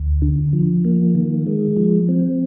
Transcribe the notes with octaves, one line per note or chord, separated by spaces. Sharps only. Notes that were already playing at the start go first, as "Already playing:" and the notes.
Already playing: D2
D3
F3
A#3
D#3
G#3
F3
C4